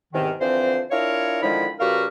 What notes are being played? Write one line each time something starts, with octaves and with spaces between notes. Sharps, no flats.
E2 G#2 C3 D#3
D3 E3 F3 C4 C5
D4 E4 F4 A#4 C#5
D3 D#3 F3 G#3 E4 B5
C#3 G3 F4 F#4 A#4 B4